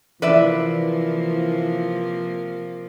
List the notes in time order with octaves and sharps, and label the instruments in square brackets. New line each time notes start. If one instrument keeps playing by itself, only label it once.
[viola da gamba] C3 F3 A#3 [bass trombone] E3 [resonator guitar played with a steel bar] B4 D5 E5